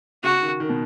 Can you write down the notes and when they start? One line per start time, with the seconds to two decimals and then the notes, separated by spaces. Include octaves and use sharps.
0.24 C#3 F#4
0.41 D#3
0.60 D#3
0.69 B2